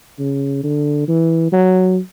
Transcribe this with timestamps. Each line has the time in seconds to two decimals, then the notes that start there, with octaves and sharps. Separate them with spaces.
0.19 C#3
0.63 D3
1.08 E3
1.52 F#3